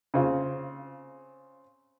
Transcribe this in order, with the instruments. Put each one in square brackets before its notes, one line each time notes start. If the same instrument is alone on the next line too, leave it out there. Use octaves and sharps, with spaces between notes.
[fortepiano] C#3 C4 F4